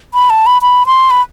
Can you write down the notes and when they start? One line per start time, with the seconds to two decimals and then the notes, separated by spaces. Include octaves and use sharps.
0.14 B5
0.30 A5
0.46 B5
0.62 B5
0.87 C6
1.10 B5